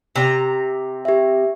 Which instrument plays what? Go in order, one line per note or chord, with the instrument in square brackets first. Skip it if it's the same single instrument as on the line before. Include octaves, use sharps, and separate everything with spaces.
[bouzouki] C3 A#5
[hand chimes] G4 E5